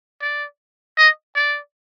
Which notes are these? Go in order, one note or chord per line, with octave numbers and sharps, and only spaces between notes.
D5
D#5
D5